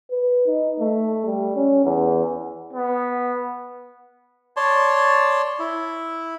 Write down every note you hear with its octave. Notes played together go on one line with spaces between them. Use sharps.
B4
D#4
A3
G3
C#4
E2
B3
C#5 D5 A5 C6
E4